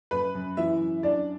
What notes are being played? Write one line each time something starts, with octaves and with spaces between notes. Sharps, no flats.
F#2 B4 B5
F#2
E3 E4 E5
F#2
F#2 D4 D5